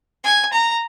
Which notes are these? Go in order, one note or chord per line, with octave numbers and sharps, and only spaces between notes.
G#5
A#5